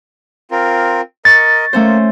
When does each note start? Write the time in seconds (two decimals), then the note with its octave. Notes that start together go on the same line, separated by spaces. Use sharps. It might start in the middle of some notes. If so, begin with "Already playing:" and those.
0.51 C4 F4 A#4
1.25 A#4 D#5 C#6 A6
1.73 A3 A#3 C#4 C5